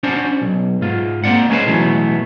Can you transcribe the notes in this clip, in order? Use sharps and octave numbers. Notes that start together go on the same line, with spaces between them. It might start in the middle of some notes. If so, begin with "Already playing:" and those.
C#4 D4 F#4 C5 D5
B1
G#2 F4
A#3 C4 D5 F#5
G#3 C#4 G#4 A4 B4 C5
B2 E3 F#3 A3 B3